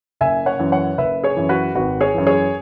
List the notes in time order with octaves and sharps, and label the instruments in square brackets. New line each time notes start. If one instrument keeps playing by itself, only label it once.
[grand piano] F#1 E5 G#5
C#5 F#5
F#2 E3
C#5 F#5
F#1 B4 E5
G#4 C#5
F#2 E3
F#4 B4
G#1 F#4 B4
G#4 C#5
F#2 E3
G#4 C#5